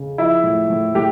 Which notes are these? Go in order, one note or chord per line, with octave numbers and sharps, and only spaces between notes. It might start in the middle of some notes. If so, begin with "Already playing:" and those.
Already playing: C#3
F3 E4
A2
A2
A2 G4